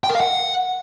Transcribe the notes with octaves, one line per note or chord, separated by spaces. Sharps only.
G5
A#4
F5
F#5